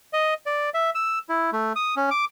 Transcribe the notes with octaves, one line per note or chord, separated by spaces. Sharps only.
D#5
D5
E5
E6
E4
A3
D#6
C#4
D6